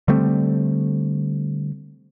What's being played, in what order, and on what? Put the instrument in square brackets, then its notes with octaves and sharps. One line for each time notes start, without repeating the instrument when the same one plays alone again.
[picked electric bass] D3 G3 A3 C4